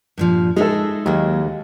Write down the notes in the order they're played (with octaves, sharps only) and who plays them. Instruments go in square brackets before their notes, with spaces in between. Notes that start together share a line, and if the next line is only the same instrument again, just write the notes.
[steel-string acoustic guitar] G2 A#2 F3
[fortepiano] G#3 A4 [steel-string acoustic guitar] D#4 G#4 E5
[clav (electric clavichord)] D#2 [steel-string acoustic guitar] F#3 A#3